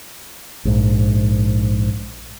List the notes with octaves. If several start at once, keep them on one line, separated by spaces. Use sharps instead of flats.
A#1 G#2